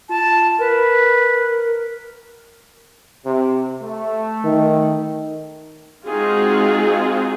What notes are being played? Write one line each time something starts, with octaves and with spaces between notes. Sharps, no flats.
F4 A5
A#4 B4
C3
A3
D#3
G#3 C4 D#4 F4 F#4 G#4